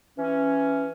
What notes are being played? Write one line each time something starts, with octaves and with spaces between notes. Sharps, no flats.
E3 C#4